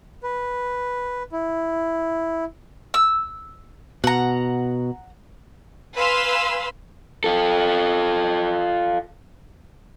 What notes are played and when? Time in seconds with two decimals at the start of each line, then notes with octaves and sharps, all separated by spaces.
0.23 B4
1.32 E4
2.94 E6
4.04 B2 F#5 A#5
5.96 B4 F5 G#5 B5 C6 E6
7.24 F4 A4